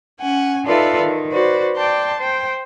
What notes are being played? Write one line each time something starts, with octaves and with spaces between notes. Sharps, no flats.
C#4 F#5 G#5
D#4 F4 A4 B4 D5 E5
D#3
F#4 B4 C5 D5
D5 G5 A5 C6
C5 G5